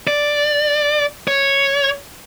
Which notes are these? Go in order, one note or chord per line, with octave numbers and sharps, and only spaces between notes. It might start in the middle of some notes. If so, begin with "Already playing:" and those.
D5
C#5